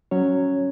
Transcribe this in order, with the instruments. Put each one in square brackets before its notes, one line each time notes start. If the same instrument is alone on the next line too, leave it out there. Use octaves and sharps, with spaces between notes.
[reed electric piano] F#3 C#4 C#5